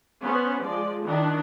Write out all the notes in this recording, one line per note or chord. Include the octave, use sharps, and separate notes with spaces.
B3 C#4 C5
F3 G#3 D5
D#3 D4 E4